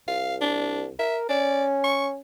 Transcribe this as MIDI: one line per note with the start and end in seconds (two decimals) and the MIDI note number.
0.08 0.91 36
0.08 0.35 77
0.42 0.84 62
0.99 1.25 70
0.99 1.17 76
1.29 2.18 61
1.29 1.65 74
1.84 2.07 85